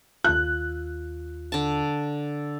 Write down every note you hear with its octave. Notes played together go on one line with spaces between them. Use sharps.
D#2 F4 F#6
D3 A5